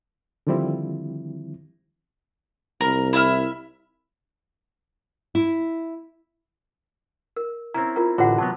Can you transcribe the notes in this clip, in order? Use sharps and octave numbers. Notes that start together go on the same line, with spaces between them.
D3 D#3 F3 G3 C4 E4
C2 A#4
E4 E5 F6
E4
A#4
C4 C#4 E4 A#5
F4 A#4 A#5
A1 D3 F4 F#4 F#5
C3 F#3 B3 A5